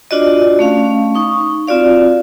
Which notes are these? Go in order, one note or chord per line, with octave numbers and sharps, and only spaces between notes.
D4 F4 F#4 D5 D#5
A3 C#4 F5
D#4 C#6
C4 F4 F#4 D5 F5